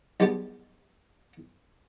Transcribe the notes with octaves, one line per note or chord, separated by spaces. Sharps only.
B1 G3 G#3 B3 G4 A5